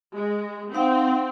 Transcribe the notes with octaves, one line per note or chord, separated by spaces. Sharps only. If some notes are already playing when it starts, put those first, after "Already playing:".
G#3
C4 D#4 F5 F#5